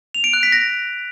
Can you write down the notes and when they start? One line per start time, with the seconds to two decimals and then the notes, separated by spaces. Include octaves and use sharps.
0.14 F7
0.24 D7
0.33 F#6
0.43 B6
0.52 A#6